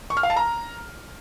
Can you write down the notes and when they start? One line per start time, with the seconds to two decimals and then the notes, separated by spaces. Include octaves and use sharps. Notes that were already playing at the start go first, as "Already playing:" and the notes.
0.10 C#6
0.17 F6
0.23 F5
0.30 A5
0.36 A#5